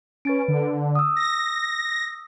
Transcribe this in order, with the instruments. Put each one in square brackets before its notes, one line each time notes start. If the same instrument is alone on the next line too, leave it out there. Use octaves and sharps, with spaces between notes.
[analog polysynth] C#4 [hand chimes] B4 A6 D7
[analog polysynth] D3
[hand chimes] D#6 E6
[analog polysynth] A#6